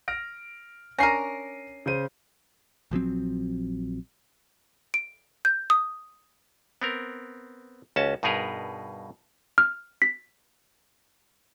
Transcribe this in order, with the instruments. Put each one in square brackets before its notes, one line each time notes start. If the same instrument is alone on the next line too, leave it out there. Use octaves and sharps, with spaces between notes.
[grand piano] F6 A#6 D7
[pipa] C#4 D4 A#4 [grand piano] A#6 C7 D#7
[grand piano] C#3 C5 D#7
[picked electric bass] A#1 F3 F#3 C4
[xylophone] D7
G6
D#6
[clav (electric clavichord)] B3 C4 A#4
C#2 C#4 F#4 A5
G2 B2 D#4 G#4 A#4 B4
[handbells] F6
B6